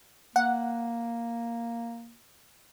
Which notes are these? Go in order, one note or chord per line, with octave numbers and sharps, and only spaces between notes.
A#3 F#5